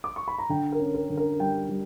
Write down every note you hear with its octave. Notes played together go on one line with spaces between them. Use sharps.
D6
C#6
B5
A#5
D3 G5
A#4
C#4
A#4
D3
A#4
G3 G5
G3